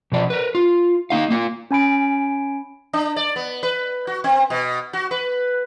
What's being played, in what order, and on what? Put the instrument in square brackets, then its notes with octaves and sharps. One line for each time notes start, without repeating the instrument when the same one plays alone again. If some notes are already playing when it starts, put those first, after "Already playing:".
[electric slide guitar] B2 F3 D5
A#4 B4
F4
A#3 D#4 F5
A#3 F4
[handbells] C#4 G#5 B5 D7
[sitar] D4
D5
B3
B4
F#4
C4
B2
F#4
B4